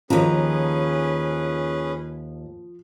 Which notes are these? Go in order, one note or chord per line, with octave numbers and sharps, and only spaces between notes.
D#2 F3 C#4 G#4 B4 A#5